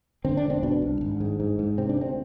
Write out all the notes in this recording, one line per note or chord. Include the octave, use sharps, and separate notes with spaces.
D3 C4
D4
E1
C4
B2 D4
C2
G#1
G#2
G#2
G#2
C3 C4
D4
D2 C4